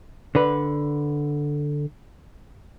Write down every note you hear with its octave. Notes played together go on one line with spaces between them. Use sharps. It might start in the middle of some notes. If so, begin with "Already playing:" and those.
D3 B4